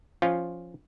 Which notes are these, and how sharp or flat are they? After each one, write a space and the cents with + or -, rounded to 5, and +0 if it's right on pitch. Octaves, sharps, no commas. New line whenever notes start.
F3 +0 C#4 +0 F4 +0